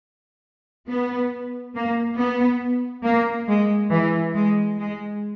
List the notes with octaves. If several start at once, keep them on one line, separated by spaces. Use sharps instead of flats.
B3
A#3
B3
A#3
G#3
E3
G#3
G#3